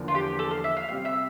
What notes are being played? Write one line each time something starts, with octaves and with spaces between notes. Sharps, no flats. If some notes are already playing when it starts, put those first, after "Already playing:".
Already playing: E2 D3 F3 A#3
F4
G4
A4
F5
E5
F5
C3 G3 C4 G4 F5
E5